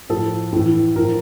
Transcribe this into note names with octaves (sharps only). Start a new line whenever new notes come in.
A2 F3 A4
A2 E3
A2 F3 A#4